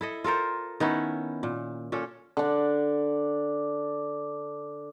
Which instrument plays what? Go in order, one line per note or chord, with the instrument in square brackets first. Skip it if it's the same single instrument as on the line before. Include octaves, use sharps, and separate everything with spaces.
[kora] E4 A4 D#5
F4 A4 A#4 C5
D#3 B3 C#4 E4
A#2
A#2 C#4 A4
[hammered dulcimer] D3 D4